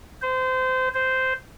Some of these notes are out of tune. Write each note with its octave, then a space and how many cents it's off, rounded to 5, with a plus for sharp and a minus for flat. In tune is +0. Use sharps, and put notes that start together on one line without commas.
C5 -25
C5 -10